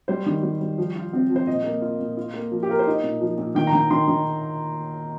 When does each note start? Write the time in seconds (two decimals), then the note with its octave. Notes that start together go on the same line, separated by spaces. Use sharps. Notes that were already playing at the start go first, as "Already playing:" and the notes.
0.08 G3 C5
0.26 D#3
0.43 G3
0.61 G3
0.78 F3
0.96 F4
1.13 C4
1.30 F3
1.36 C5
1.47 A#2 D#5
1.64 A#3
1.82 F4
2.00 A#2
2.17 F4
2.34 A#3
2.51 F3
2.63 G4
2.69 F4 A#4
2.79 C5
2.87 D#4 D#5
3.03 A#2
3.21 F3
3.38 A#2
3.55 D#3 G5
3.67 A#5
3.73 D#3 G5
3.90 D#3 C6
4.08 D#3